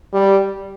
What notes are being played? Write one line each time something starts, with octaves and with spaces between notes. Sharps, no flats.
G3